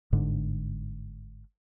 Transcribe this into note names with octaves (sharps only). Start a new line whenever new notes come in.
G1 G#2 D3